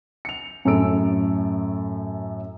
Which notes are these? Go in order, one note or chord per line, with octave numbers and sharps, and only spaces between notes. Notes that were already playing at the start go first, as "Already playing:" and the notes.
C#7 F7
F#2 A2 C#4 A4 E6 D7